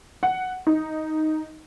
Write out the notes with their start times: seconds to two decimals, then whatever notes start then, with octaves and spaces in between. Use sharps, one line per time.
0.23 F#5
0.67 D#4